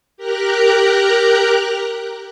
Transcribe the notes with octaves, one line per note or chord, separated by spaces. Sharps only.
G4 A#4 A#5 F#6